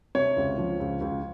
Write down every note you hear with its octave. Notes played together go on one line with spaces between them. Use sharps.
C3 C#5
C#2
F3
C#2
C#2